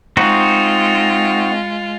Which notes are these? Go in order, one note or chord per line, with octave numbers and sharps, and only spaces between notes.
G#3 C4 D#4 F4 F#4